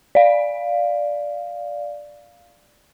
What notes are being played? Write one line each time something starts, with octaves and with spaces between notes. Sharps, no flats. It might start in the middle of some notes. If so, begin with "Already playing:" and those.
D5 F5